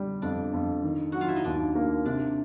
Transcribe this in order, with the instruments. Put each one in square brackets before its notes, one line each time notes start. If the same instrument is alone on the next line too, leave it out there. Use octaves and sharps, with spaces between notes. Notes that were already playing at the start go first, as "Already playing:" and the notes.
Already playing: [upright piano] D3 G3
[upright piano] F2 [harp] D4
[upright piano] F2
D#3
[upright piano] F#3 [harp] F#4
[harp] F4
E4
D#4
[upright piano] D#2 [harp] D4
[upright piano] A#3
[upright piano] C3 [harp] D4